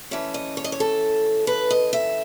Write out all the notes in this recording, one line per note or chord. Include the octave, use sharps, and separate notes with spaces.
E3 A3 C#4 E5
D#5
C#5
D#5
C#5
A4
B4
D#5
E5